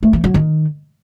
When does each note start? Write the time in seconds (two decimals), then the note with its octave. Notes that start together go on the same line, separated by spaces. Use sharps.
0.03 A3
0.13 E3
0.24 F#3
0.34 D#3